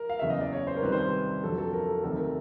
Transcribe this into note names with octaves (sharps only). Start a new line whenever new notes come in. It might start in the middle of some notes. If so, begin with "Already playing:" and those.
Already playing: A#4
F5
F#1 E2 C#3 E5
D#5
D5
C#5
C5
A#4
C2 C3 D#3 G3 B4
C5
B4
F2 D3 F#3 A4
A4
A#4
A4
D2 C3 D#3 F#3 A4
A#4